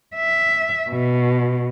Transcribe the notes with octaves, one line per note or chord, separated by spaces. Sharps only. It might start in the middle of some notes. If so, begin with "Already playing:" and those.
E5
B2